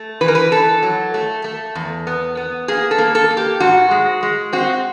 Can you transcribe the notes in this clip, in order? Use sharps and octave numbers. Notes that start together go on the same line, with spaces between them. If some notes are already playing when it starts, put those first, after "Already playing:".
Already playing: A3
E3 B4
A#4
B4
E3 A4
F#3
A3
A3
E2
B3
B3
A#3 G#4
A4
A#3
A4
A#3
G4
G#2 F#4
G#3
G#3
C4 F#4